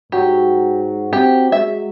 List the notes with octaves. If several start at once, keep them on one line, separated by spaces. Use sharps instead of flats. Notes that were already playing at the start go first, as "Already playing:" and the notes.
G#2 F#3 G4
C4 G4
G#3 E5